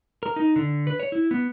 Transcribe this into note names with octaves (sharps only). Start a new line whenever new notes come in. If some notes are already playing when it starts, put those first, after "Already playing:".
A#4
D#4
D3
B4
C#5
E4
B3